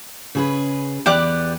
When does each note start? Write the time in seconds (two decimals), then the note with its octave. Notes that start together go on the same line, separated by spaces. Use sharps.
0.35 C#3 G#4 B4
1.06 E2 B3 G4 D5 F#6